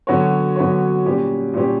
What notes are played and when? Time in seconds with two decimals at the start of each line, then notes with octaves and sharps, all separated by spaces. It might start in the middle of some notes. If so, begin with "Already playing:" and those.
0.07 D3 F#3 B3 F#4 C#5
0.56 D3 F#3 B3 F#4 C#5
1.05 A#2 G3 C#4 G4
1.54 A#2 G3 C#4 G4